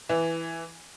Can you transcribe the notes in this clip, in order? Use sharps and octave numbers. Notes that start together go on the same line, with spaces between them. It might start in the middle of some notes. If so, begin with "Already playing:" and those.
E3